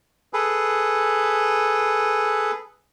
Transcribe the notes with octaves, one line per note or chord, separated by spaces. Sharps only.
G#4 A4 B4